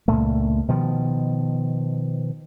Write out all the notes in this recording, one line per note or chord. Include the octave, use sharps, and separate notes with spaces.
C#2 G2 A#2 A3
B2 D#3 F3